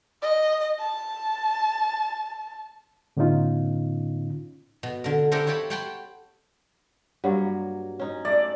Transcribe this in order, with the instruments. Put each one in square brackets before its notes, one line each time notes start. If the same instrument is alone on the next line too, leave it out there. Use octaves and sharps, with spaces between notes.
[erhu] D#5
A5
[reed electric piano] A2 D3 B3 C#4 D#4 F4
[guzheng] B2
D3 A#4
D4 E4 G4 A4 A#4 C5
C5 C#5 F5 G5 A5 B5
C#5 F#5 G5 A5 B5 C6
[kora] G2 F#3 A#3
C#4 D#4
[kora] A3 [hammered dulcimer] D5